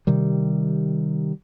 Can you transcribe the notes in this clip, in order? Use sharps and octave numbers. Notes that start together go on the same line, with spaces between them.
C3 D#3 G3